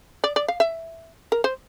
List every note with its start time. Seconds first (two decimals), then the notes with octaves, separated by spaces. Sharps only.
0.24 D5
0.36 D5
0.48 F5
0.60 E5
1.32 A#4
1.44 C5